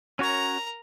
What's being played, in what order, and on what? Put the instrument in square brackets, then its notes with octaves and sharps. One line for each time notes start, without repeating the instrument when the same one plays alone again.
[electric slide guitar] C#4 F#4 C#5 [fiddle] A#4 A#5